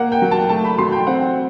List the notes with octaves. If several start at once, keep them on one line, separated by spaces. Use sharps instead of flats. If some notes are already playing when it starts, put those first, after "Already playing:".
Already playing: A#3 F#5
G5
F#3
A5
A3 A5
B5
F#3 C6
G5
C4 F#5